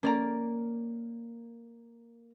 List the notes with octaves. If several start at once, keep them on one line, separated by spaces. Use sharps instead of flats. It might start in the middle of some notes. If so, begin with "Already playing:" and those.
A#3 C#4 D5 A#5